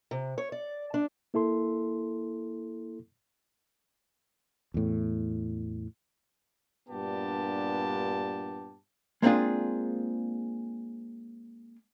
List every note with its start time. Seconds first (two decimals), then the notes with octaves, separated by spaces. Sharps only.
0.11 C3
0.38 C#5
0.52 D5
0.94 D4
1.34 A#3 E4 A4 C6
4.74 E2 A2
6.89 G2 A#2 B3 D4 G4 A5
9.22 G#3 A#3 C4 D4 F4 G#4